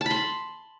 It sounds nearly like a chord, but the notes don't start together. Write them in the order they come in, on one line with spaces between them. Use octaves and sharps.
A5 B5 C6